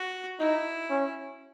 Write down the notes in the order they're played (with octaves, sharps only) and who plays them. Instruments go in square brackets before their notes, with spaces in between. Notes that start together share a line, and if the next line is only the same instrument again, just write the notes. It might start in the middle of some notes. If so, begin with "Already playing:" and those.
Already playing: [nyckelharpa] F#4
[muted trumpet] D#4 [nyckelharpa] E4
[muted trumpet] C#4